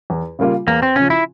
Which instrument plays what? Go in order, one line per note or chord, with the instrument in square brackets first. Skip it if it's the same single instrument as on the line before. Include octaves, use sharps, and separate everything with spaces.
[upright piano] E2
C#3 G3 A#3 F4
[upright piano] E2 [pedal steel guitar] A#3
[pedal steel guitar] C4
[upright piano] C#3 F3 [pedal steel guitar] C#4
[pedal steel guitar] E4